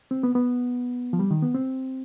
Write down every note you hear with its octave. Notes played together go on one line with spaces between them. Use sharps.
C4
B3
B3
F3
G3
D#3
B3
C4